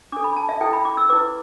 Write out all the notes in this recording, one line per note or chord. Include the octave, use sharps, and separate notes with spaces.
D4 A4 D6
B5
A5
E5
E4 A4 G5
B5
D6
E6
E4 B4 D6